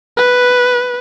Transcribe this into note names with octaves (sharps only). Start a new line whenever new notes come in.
B4